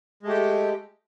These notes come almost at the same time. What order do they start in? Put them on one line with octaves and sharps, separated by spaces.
G#3 A3 G4